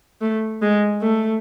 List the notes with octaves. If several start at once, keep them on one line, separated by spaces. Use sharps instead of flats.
A3
G#3
A3